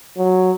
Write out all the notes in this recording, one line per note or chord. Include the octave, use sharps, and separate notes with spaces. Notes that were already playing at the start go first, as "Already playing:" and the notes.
F#3